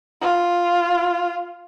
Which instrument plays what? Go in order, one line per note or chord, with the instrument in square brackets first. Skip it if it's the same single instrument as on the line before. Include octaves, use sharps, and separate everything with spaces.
[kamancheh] F4